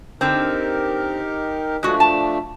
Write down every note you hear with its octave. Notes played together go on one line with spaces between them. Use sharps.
D3 C4 D#4 G4 A#4
F3 G#3 A3 D4 F#4
A5